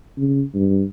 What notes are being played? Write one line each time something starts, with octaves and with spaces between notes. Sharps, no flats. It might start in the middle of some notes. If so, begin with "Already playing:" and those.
C#3
G2